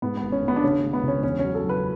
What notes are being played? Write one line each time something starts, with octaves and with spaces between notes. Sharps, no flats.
G#2 B3
B3
G#1
C#4
G#1
B3
D4
C#3 C#4
G#3
B3
C#2
C#4
E2 C#4
F#3 C#4
A4
F#1
B4